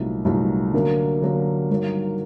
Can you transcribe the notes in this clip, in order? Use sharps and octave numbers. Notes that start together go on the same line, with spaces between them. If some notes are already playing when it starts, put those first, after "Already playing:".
Already playing: C2 A#2 F#3 A3 D#4
C2 A#2 F#3 A3 D#4
D3 F#3 A#3
D3 F#3 A#3
G2 D#3 F#3 A#3